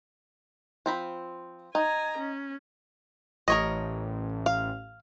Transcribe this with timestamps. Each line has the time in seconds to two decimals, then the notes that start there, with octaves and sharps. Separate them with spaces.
0.86 F3 C4 B5
1.75 D#4 G#5 A#5
2.17 C#4
3.48 A1 A#4 C#5 D#5
4.46 F5